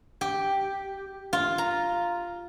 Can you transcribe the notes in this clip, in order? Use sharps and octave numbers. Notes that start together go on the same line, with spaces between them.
G4
F4
A#5